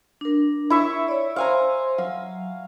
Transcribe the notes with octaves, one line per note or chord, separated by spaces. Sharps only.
D4 A#4
E4 E5 C#6
C#5 D5
C5 F5 G#5 A#5 C6
F#3 F5